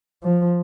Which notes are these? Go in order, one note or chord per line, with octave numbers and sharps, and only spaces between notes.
F3